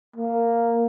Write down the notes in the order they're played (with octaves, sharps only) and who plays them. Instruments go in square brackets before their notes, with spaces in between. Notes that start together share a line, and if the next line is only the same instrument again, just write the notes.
[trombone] A#3